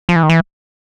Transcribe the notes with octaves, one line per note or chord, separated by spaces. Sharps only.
F3
E3
D#3
E3